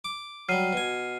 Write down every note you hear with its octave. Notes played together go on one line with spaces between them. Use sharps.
D6
F#3 G3 F6 C7 D#7
B2 G#5